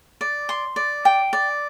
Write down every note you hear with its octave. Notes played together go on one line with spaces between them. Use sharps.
D5
C6
D5
G5
D5